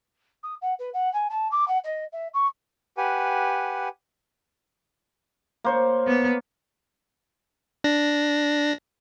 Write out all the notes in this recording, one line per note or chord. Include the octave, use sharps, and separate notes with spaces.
D#6
F#5
B4
F#5
G#5
A5
D6
F#5
D#5
E5
C#6
G4 B4 F#5 G#5
A#3 C5 C#5
B3
D4 A#6